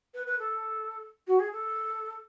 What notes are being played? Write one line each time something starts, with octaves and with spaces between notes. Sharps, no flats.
B4
B4
A4
F#4
G#4
A4